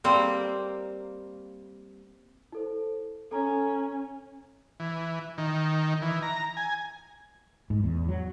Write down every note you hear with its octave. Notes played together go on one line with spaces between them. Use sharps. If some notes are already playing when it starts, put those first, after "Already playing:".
G3 A#3 C4
E4 A4 C5
C#4 A4 A#5
E3
D#3
E3
A#5
G#5
G#2
E2
F#3